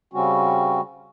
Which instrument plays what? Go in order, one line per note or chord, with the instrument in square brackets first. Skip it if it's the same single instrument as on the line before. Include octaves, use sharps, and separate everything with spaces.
[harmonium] C#3 G3 C4 C#4 F#4